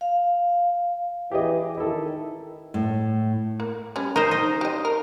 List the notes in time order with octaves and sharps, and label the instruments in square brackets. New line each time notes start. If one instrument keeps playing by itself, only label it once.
[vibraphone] F5
[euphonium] E3 [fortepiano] G4 G#4 D#5
[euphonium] D#3 [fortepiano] E4 A4
[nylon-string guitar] A2
[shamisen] A#3
G3 C#4
[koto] D#4 C5 [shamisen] A#4
[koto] D#4
[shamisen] G4 D#5
A#4